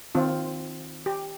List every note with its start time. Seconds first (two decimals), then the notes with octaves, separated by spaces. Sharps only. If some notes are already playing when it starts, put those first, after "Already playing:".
0.15 D#3 C4 F4
1.06 G4